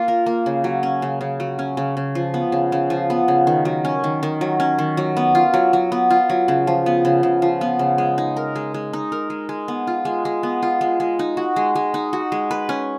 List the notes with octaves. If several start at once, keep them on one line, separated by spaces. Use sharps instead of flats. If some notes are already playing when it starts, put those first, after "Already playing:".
Already playing: A#3 F4
A#4
A#3
C#3
F#3
C#4
C#3
C#3
F#3
C#4
C#3
C#3
F3
B3
C#3
C#3
F3
B3
C#3
D#3
F#3
C#4
D#3
D#3
F#3
C#4
D#3
F#3
B3
F4
F#3
F#3
B3
F4
F#3
C#3
F3
B3
C#3
C#3
F3
B3
C#3
G#3
D#4
A#4
G#3
G#3
D#4
A#4
G#3
G#3
B3
F4
G#3
G#3
B3
F4
G#3
G#3
D#4
F#4
G#3
G#3
D#4
F#4
G#3
B4
C#4